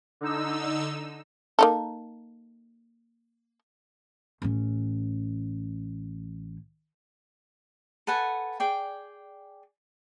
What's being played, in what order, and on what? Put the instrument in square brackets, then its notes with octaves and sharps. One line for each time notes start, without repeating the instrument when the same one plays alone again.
[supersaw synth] D3 D#4 E6
[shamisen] A#3 D#4 A4
[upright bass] A1 C#4
[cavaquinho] A4 B4 F#5 G#5
G#4 D5 G5